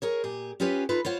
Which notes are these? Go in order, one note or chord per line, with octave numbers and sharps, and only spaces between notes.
G#4 A#4 C#5
A#2 G4 G#4
C#4 F4 G4 G#4 B4 C#5
D#4 F4 A4 B4
F4 C5 C#5 F#5